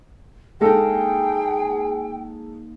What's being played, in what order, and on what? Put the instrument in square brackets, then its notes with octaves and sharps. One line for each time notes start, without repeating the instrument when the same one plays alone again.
[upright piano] G#3 A4 [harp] A#3 D#4 [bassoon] G#4 [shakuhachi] G5